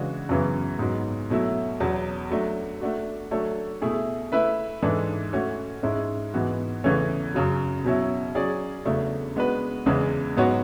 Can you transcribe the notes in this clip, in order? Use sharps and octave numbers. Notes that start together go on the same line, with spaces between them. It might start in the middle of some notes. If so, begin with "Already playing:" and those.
Already playing: C#3 E3 G#3 D4 F#4
F#2 C#3 E3 B3
G#2 F#3 B3
B2 F#3 A3 E4
E2 B2 F#3
F#3 A3 D4
A3 D4 F#4
F#3 A3 D4 A4 C#5
B2 A3 E4 G#4
A3 E4 B4 E5
G#2 E3 G#3 D4 A4
A3 C#4 F#4
G#2 G#3 C#4 E4
G#2 E3 B3 F#4
E2 C#3 E3 A3 C#4
F#2 C#3 F#3
B2 F#3 C#4 E4
F#3 C#4 G#4 D5
E2 C#3 F#3 A3 D4
G#3 B3 D4 F#4 B4
E2 C#3 E3 G#3
G#2 F#3 B3 F#4 C#5